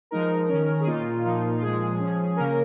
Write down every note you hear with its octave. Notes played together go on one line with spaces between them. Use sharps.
F3 G#3 D#4 A#4
D#3 C#4
G#4
A#2 A#3 D#4 F4
A#2 F3 A#3 D#4
F4
A#2 F3 G#3 G#4
F3 C#4
C#3 A#3 C#4 A#4